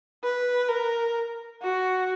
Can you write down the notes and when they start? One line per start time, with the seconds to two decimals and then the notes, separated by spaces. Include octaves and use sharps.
0.24 B4
0.69 A#4
1.62 F#4